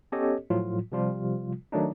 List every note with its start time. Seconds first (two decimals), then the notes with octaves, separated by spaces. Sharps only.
0.12 B3 C#4 G4 A4 C#5 D#5
0.50 A2 F3 F#3 F4
0.92 C3 F3 G3 F4
1.72 D#3 F#3 A3 D4 D#4